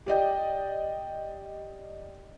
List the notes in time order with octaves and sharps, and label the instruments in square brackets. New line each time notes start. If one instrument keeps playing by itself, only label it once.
[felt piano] G4 D5 D#5 G5